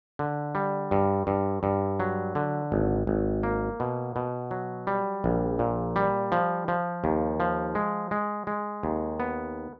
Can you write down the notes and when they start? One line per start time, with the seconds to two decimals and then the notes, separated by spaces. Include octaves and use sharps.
0.19 D3
0.55 G3
0.91 G2
1.27 G2
1.63 G2
2.00 F#3
2.35 D3
2.72 G#1
3.07 G#1
3.43 A#3
3.80 B2
4.16 B2
4.51 F#3
4.87 G3
5.24 A#1
5.59 A#2
5.96 G3
6.32 F3
6.68 F3
7.04 D#2
7.40 F3
7.75 G#3
8.11 G#3
8.47 G#3
8.83 D#2
9.20 B3